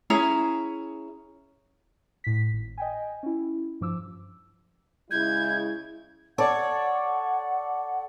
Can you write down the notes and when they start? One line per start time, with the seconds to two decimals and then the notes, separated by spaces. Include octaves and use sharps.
0.10 C#4 E4 G#4 A#5
2.24 A2 B6
2.53 G#1
2.78 D#5 G5 G#5
3.23 C#4 E4
3.81 G2 F3 D6 E6
5.11 C#3 G#3 E4 G6 G#6
6.38 A4 C#5 D5 F#5